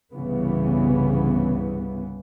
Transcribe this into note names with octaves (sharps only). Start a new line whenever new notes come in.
C2 G2 C#3 E3 B3